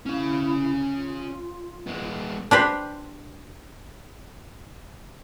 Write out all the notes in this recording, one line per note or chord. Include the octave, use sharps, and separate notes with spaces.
C#4 E4 F5
F4
G#3 B3
D4 G4 B4 C5